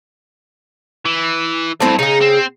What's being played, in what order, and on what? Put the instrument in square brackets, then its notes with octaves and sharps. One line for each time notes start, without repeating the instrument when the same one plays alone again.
[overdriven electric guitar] E3
[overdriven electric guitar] C#2 G2 [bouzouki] A3 C4 E4
[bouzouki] C#3 G#4 [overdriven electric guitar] D#4
[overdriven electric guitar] C4